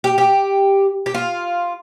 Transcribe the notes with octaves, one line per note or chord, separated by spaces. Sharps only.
G4
G4
G4
F4